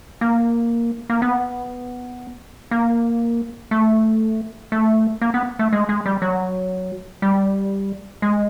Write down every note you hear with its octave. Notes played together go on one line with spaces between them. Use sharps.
A#3
A#3
B3
A#3
A3
A3
A#3
B3
A3
G#3
G#3
G3
F#3
G3
G#3